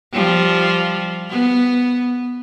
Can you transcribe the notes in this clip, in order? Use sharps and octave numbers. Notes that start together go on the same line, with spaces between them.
F3 G3
B3